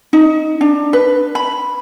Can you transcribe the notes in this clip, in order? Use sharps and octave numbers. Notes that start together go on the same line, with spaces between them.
D#4
D4
B4
B5